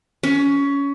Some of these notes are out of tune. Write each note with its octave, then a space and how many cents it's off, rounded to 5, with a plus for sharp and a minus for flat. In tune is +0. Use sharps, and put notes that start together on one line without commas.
C#4 +20